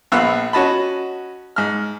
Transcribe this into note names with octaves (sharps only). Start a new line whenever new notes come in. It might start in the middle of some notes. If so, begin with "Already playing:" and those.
A#1 B3 F5 F#5 E6 F#6
C#4 F#4 D#5 A5 B5
G#2 F6